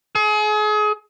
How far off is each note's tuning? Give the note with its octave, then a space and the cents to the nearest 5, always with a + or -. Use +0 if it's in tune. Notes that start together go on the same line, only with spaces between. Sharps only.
G#4 +35